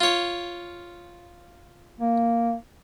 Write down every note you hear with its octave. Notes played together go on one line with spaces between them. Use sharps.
F4 C#5
A#3